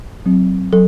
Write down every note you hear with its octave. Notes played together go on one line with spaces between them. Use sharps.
F#3 C4
F#3 A4